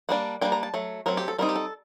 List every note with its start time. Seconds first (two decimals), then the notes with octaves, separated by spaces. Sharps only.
0.09 G3 A#3 D4 F#5
0.41 G3 A#3 D4 G5
0.52 A#5
0.63 A5
0.74 F#3 A3
1.06 F#3 A3 C4 A#4
1.17 G4
1.28 A4
1.38 G3 C4 D#4 A#4
1.49 G4
1.56 A4